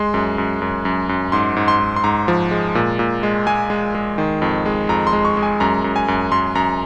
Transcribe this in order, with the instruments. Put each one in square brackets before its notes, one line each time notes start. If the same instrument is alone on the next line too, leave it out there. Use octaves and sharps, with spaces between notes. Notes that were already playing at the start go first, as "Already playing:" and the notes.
Already playing: [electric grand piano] G#3 C6
F#2
F#2
F#2
F#2
F#2
G#2 C6
G#2
C6
G#2
C6
G#2 A#5
F3
G#3
A#2
A#2
G#3
G#3 G#5
G#3
G#3
D#3
F2
G#3
F2 A#5
C6
G#3
C#6
G#3
G#5
F#2 A#5
F#2
G#5
F#2
F#2 C6
F#2 A#5